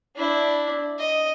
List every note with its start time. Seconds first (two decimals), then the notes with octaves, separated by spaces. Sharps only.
0.16 D4 E4
0.98 D#5